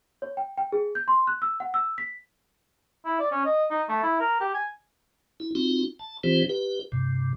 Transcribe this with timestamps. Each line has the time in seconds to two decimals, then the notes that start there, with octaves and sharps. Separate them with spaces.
0.22 C#5
0.37 G5
0.58 G5
0.72 G#4
0.95 G6
1.08 C6
1.27 F#6
1.42 E6
1.60 F#5
1.74 E6
1.98 B6
3.05 E4
3.20 D5
3.32 C#4
3.45 D#5
3.71 D#4
3.89 A3
4.03 E4
4.20 A#4
4.41 G4
4.54 G#5
5.40 E4
5.55 C4 D#4 F4 F#4
5.99 A5
6.24 E3 C4 F4 G4 C5
6.49 G4 B4
6.92 G2 C3